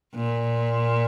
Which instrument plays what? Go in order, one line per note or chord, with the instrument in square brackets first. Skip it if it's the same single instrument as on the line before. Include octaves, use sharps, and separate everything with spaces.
[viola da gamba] A#2